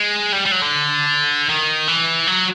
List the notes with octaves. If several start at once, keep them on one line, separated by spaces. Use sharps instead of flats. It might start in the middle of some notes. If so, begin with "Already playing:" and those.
Already playing: G#3
G3
G3
F#3
D3
D#3
E3
F#3